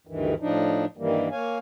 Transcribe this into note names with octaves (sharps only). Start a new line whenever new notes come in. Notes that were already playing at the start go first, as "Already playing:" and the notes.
D2 G2 D#3 E3
A2 F3 D4 D#4
G2 D#3 E3 G3 A#3
A#3 C#5 F5 G#5